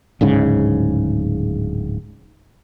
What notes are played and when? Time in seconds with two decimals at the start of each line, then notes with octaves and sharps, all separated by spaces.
0.21 D1 G#2 C#3